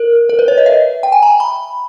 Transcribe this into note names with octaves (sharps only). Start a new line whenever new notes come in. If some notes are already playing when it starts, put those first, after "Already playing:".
Already playing: A#4
A#4
B4
C#5
D#5
E5
G5
G#5
A#5
B5